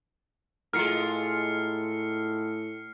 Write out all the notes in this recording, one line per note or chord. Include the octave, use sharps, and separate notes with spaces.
A2 G#3 F4 A#4 F6 C7 C#7